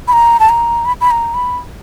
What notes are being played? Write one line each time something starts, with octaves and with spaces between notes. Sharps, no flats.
B5
A#5
A5
A#5
B5
B5
A#5
B5